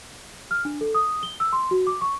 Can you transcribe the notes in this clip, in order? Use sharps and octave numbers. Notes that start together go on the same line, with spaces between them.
F6
D4
A4
D#6
G7
E6
C6
F#4
D6
C#6